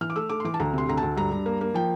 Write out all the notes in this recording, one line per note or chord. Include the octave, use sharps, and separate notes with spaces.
E3 F6
D6
A3 E6
A3 D6
C6
E3 D6
A5
D2 A#5
C3 C6
D2 A#5
A5
D2
G2 A#5
G2
A#3
A#3
F3 G5